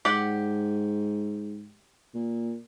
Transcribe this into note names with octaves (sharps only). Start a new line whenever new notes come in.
G#2 G4 D5 F#5
A#2